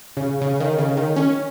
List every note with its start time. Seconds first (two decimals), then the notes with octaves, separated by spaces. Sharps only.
0.17 C#3
0.41 C#3
0.60 D#3
0.79 C#3
0.97 D#3
1.16 C#4